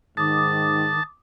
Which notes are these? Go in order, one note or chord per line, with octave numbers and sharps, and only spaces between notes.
G#2 D#3 A5 D6 D#6